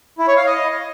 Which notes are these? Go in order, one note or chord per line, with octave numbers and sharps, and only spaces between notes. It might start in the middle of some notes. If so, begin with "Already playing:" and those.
E4
C#5
F5
D#5